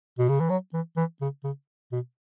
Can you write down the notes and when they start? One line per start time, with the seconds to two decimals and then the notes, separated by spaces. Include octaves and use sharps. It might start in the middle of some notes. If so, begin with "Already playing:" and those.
0.19 B2
0.29 C#3
0.40 E3
0.50 F#3
0.74 E3
0.97 E3
1.21 C#3
1.44 C#3
1.92 B2